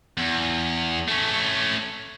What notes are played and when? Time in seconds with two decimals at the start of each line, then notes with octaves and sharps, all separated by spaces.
0.17 E2
1.08 A3 C#4